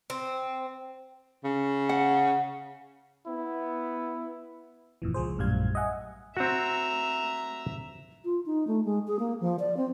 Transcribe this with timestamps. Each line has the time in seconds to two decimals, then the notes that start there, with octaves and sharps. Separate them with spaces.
0.10 C4
1.44 C#3
1.89 F#5
3.27 B3 E4
5.02 G1 F2 A#2 E3
5.14 C#2 F3 G#4 C5
5.38 A#1 F#2 A2 G3 F5 G#6
5.75 D#5 E5 F#5 G#5
6.37 C4 F#4 E5 A#5
8.25 F4
8.46 D#4
8.67 A3
8.85 G#3
9.07 G#4
9.19 A#3
9.41 F3
9.59 D5
9.77 C4